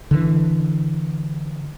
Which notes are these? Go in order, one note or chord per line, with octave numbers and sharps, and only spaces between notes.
D3 E3